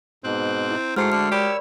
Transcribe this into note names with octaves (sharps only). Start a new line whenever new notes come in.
G#2 B2 C4 F#6
E4
G#2 G#3 A3 F#4 C5 F6 C7 C#7
D3 F6
G4 A#4 C#5 D5 B5 E6